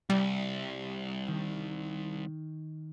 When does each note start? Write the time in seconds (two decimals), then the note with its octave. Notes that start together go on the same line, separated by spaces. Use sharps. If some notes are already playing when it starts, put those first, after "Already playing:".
0.10 C2 G3
1.27 D#3